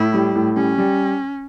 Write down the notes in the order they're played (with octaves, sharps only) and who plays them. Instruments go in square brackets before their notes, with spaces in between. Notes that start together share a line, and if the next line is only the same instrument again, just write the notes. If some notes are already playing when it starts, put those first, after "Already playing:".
Already playing: [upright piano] A2 [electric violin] E4
[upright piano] G3
A2
[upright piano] G3 [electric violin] C#4
[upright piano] G3